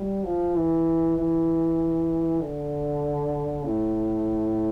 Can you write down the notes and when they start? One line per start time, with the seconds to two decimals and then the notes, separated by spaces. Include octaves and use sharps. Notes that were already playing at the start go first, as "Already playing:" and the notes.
Already playing: G3
0.24 F3
0.55 E3
1.17 E3
2.41 D3
3.65 A2